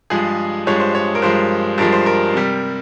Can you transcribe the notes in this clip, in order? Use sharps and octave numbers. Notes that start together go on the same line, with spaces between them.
G2 F3 G#3 G#4
G2 F3 G#3 C#5
C5
C#5
A#4
G2 F3 G#3 C5
G2 F3 G#3 A#4
C5
A#4
C3 G3